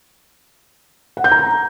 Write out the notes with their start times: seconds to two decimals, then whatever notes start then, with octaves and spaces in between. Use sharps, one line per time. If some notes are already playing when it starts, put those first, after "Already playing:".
1.17 F#5
1.24 G6
1.32 A#5